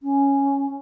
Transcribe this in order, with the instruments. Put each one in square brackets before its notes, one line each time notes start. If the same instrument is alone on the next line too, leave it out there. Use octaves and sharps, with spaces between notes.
[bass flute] C#4